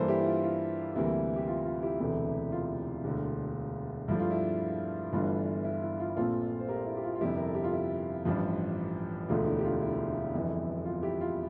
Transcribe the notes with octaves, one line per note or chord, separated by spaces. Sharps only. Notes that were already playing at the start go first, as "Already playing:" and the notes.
Already playing: G2 E3 A#3 D4 A4 C5
E4 G4
E4
F4
F4
D2 C3 E3 G3 A#3 E4
G4
F4
F4
E4 G4
E1 D2 C3 E3 A3
F4
E1 D2 D3
G2 F3 A3 D4 E4
F4
E4
G1 G2 E3 A3 D4 F4
E4
E4
F4
A#1 A#2 A3 C4 F4 A4
C5
G4 A#4
E4
G4
F4
F4
G1 F2 C3 E4 G4
A#4
A4
G4
F4
E4
A1 G2 F3
E1 D2 D3 A3 F4
E4
G4
F4
E4
G1 F2 E3
F4
E4 G4
F4